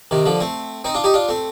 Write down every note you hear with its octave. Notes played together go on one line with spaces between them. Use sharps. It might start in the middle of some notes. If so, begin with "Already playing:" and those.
C3 D#3
D3 F3
A3 C4
C4 D#4
D4 F4
D#4 G4
D4 F4
A3 C4